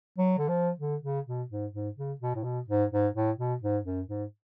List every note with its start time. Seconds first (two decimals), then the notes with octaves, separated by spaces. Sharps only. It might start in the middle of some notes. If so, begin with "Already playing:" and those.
0.18 F#3
0.38 D3
0.49 F3
0.80 D3
1.04 C#3
1.27 B2
1.50 G#2
1.73 G#2
1.97 C#3
2.21 B2
2.35 A2
2.44 B2
2.68 G#2
2.92 G#2
3.15 A2
3.38 B2
3.62 G#2
3.85 F#2
4.08 G#2